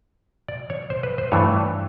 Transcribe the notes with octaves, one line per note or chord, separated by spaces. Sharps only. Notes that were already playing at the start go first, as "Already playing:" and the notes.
D5
C#5
C5
B4
C5
G2 E3 A3 C#5